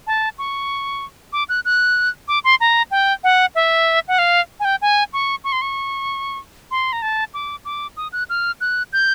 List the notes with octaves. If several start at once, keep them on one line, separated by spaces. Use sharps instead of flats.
A5
C#6
D6
F#6
F#6
D6
C6
A#5
G5
F#5
E5
F#5
F5
G#5
G5
G#5
C#6
C#6
C6
C#6
C6
A#5
A5
D6
D6
D#6
F#6
F6
F#6
G6